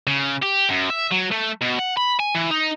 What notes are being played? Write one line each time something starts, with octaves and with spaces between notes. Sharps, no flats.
C#3
G4
F#2
E5
F#3
A3
B2
F#5
B5
G#5
E3
D#4